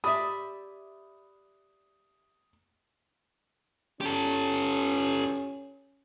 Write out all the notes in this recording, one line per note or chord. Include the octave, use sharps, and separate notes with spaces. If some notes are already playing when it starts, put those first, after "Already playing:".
G4 D5 E5 B5 D#6
C#4 G4 A4